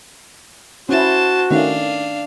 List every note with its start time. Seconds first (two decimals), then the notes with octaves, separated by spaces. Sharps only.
0.89 C#4 E4 F#4 C5 A5
1.51 D#3 A3 C#4 D4 F5